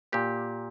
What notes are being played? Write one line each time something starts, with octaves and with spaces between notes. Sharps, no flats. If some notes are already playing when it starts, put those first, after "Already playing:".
A#2 A#3 G4